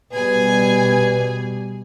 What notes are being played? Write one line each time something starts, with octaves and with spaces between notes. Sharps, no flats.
B2 G3 G#4 B4 G#5